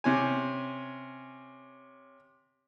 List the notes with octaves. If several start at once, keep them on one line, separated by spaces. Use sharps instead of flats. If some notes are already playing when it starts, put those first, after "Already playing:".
C3 C#4 G#5